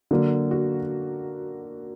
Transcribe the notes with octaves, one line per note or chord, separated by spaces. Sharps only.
D3 F#3 A#3
F#4